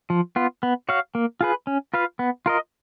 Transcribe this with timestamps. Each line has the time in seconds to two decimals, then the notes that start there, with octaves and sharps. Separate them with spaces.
0.10 F3
0.36 B3 F4
0.63 B3
0.89 F#4 C#5 F5
1.15 A#3
1.41 F4 G#4 B4
1.67 C#4
1.94 F4 B4 F5
2.19 B3
2.46 F4 A#4 D#5